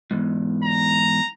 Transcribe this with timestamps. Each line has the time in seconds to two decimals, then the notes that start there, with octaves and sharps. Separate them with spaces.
0.11 E2 G#2
0.64 A#5